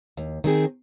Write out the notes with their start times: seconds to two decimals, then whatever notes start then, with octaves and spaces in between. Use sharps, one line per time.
0.17 D#2
0.44 D#3 C4 G#4